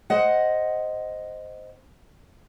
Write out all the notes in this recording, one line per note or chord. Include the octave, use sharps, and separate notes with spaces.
C5 D#5 F#5